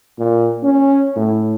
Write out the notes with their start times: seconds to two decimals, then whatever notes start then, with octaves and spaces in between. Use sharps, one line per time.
0.18 A#2
0.63 C#4
1.16 A2